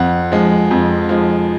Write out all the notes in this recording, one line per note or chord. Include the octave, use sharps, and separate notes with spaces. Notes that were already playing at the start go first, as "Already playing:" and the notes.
Already playing: F2 F#5
F3 G#3
F2
F3 G#3